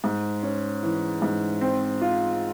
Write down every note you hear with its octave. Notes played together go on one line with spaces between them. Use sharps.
G#2
C#4
E3
G#2
C4
F4